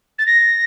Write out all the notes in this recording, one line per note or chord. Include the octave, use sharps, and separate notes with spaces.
A6
A#6